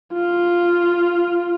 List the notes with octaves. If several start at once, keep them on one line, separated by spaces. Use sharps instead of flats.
F4